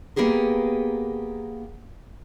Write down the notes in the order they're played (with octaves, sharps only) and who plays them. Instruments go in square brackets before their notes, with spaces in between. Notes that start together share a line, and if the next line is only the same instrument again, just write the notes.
[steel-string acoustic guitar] A#3 B3 G4 G#4 A#4